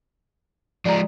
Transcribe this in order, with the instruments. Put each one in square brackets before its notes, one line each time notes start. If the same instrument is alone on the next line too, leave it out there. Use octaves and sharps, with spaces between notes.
[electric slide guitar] F3 G#3 [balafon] D5 A#5